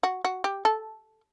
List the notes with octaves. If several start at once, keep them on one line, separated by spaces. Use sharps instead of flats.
F#4
F#4
G4
A4